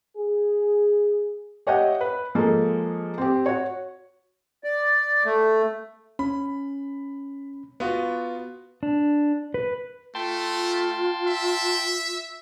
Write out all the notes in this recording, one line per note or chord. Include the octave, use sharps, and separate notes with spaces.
G#4
G4 C#5 D#5 E5 F#5 G5
B4
F3 G#3 A#3 A4
C4 G4
F#4 C#5
D5
A3
C#4 B5
B3 F4 F#4
D4
B4
A3 F4 G5 A5 C6
E5